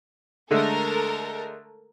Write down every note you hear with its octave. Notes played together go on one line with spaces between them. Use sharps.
D3 G#3 A3 A4 A#4